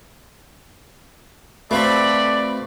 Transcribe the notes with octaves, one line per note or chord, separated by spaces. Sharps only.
A3 C4 F#4 A4 B4 D5 F5 B5